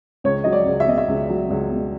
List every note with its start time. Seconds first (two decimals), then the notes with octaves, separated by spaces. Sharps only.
0.24 C#2 C#5
0.44 F#3 D#5
0.52 D5
0.66 C#2
0.80 E5
0.87 B2 D#5
0.98 E5
1.08 C#2
1.29 F#3
1.50 C#2
1.71 B2